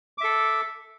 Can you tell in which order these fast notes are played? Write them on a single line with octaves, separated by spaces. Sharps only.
D6 E5 A4